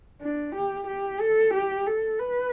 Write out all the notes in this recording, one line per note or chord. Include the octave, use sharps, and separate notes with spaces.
D4
G4
G4
A4
G4
A4
B4